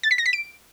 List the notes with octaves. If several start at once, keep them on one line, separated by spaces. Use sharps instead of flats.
A6
B6
A#6
B6
D7